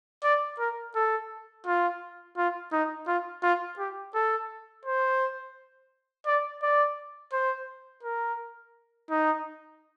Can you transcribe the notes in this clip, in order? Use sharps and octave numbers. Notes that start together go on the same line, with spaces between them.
D5
A#4
A4
F4
F4
D#4
F4
F4
G4
A4
C5
D5
D5
C5
A#4
D#4